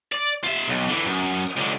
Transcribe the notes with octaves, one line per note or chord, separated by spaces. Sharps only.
D5
F4 E5
B1
D3 E3
F#2
C#2 D3